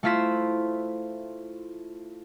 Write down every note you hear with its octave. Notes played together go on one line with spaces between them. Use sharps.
A3 E4 F4 C5 B6 E7